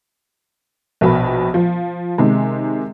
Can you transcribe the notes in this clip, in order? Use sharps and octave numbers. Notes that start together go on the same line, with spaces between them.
A#1 B2 B5
F3
C3 D#3 G#3